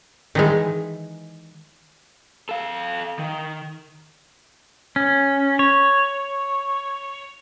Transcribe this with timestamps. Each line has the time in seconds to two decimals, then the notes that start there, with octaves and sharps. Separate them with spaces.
0.35 D#3 E3 G#3
2.49 A4 F5
3.19 D#3
4.96 C#4
5.59 C#5